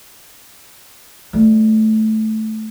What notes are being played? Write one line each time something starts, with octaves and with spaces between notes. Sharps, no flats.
G3 A3